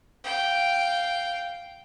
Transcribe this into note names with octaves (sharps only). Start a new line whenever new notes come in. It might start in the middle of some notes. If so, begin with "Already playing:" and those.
F5 G5